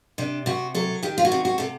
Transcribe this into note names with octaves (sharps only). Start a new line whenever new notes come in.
C3 D4
C3 F#4
F#3 A4
D#3 G4
F4
F#4
C3
F#4
C3 A4